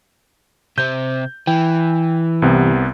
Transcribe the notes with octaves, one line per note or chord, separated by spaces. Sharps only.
C3 C4 G6
E3 G5
C2 C3 B3